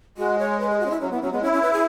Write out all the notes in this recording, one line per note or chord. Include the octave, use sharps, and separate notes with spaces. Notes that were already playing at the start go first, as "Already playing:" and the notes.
G#3 F#4
C#5
B4
G#4
F#4
C#4
E4
F#3 C#4
E3 B3
F#3 C#4
G#3 B3
C#4 E4
C#4
B4
G#4